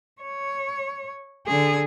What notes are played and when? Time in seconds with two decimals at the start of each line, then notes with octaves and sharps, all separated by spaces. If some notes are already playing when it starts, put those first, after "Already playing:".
0.22 C#5
1.47 D3 G#4